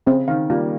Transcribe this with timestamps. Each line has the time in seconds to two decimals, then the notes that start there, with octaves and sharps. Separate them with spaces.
0.06 C#3 C4
0.28 D#3 F5
0.50 G3 A#3 F4